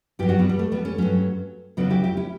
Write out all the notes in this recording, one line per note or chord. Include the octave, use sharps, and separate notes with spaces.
G2 F#3 E4 G4
D4 F#4
G3 B3
G3
A3
G3 B3
A3 C#4
G2 F#3 A3 C#4
D2 C#3 F#3 B3 D4
E4 G4
E4 G4
C#4 E4